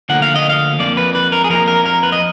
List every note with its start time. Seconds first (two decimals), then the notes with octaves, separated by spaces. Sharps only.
0.09 D2 D3 F3 A#3 F#5
0.22 F5
0.36 D#5
0.49 F5
0.79 F2 F3 A#3 D5
0.97 B4
1.15 B4
1.32 A#4
1.44 G#4
1.50 F2 F3 A#3 A#4
1.68 A#4
1.86 A#4
2.03 B4
2.12 D#5